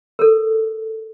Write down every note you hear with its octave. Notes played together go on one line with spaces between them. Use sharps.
A4 A#4